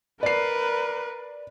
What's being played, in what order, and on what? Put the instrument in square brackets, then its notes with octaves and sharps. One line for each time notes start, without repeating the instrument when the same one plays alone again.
[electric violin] A#4 B4 [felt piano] D5 C7